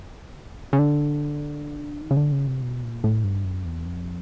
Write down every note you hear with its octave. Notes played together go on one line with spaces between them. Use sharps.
C#3
D3
D#3
C#3
D3
C#3
C3
B2
A#2
A2
G2
F#2
E2
F2